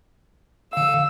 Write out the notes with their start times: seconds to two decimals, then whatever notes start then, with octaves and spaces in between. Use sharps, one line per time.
0.73 D3 F5 E6